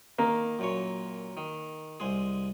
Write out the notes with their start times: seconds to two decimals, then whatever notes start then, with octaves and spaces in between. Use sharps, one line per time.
0.19 D#3 A#3
0.59 F#2 A#2 C#5
1.37 D#3
2.00 C2 G#3 G#4